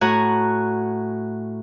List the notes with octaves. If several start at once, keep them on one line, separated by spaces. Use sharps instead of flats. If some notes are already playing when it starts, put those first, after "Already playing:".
A2 F#4 F#5 G#5 A#5